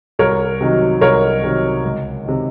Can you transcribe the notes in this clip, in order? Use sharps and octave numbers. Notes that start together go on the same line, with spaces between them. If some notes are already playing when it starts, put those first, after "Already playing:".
C2 A#4 C#5
C3 D#3 F#3
C2 A#4 C#5
C3 D#3 F#3
C#2
C3 D#3